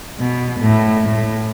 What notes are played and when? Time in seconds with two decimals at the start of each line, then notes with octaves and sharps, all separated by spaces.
0.20 B2
0.61 A2
1.03 A2